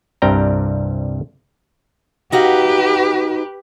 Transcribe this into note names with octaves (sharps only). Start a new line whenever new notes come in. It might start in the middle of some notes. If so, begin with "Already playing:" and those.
C2 G2 C3 G3 G5 A#5
D#4 F#4 G4 B4 F5